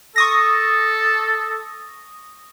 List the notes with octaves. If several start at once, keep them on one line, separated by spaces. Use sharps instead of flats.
A4 C#6 D#6 A#6